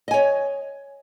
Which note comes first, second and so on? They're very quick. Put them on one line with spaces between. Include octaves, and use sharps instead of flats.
D#5 G#5 C#5